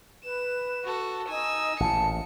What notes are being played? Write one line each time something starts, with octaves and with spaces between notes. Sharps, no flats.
B4 E7
F#4 A4
D#4 G#5 E6
A1 A#2 A5 C#7